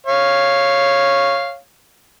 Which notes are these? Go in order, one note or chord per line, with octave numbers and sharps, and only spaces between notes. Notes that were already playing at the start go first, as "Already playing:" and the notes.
C#5 F5